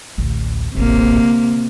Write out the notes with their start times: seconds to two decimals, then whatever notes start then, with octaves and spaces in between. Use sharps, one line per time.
0.18 A1 D2
0.75 D#1 A1 C3 A#3
1.18 D3